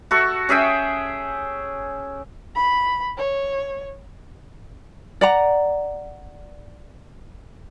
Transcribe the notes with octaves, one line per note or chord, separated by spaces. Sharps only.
F#4 A4 C#6
C#4 G#4 E5 G5
B5
C#5
D5 F#5 A#5